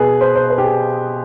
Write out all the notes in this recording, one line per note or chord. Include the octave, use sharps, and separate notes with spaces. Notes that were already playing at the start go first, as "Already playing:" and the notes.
Already playing: B2 G#4 B4
C5
C5
B4
G4
G#4